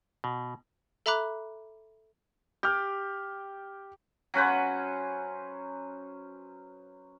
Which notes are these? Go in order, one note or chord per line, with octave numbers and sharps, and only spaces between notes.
B2
A4 E5 A#5 B5 D6 F#6
G4 F6 G6
F#3 C#4 B4 C5